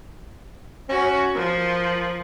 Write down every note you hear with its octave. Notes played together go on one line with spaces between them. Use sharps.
C#4 F#4
F3 A#4